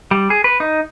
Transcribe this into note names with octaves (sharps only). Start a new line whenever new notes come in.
G3
G#4
B4
D#4